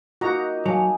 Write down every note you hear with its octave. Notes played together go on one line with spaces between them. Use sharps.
A#3 D#4 F4 F#4 D#5 A#5
F#3 F5 G#5 A5